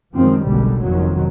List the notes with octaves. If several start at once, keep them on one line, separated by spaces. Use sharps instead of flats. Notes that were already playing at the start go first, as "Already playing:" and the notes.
F#2 D#3 F3 G#3 C4
F#1 B1 B2 D3 G3 G#3
C2 F2 C3 D#3 F#3